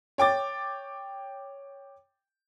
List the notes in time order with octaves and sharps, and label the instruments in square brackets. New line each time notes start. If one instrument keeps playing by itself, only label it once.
[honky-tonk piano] C#5 G5 D6 A6